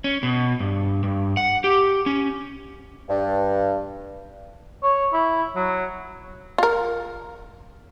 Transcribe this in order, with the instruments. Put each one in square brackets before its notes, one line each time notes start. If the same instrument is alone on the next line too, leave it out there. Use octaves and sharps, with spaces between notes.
[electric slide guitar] C#4
B2
G2
G2
F#5
G4
C#4
[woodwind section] G2
[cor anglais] C#5
E4
F#3
[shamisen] F4 A#4